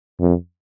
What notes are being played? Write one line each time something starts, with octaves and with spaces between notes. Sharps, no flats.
F2